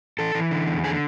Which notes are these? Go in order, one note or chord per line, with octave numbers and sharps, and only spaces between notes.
E3 A4
E3
D3
E2
D3 G#4